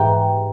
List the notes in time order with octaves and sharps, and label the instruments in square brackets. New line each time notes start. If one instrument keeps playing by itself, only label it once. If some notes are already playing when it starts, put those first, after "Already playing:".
Already playing: [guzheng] G#2 E3 G4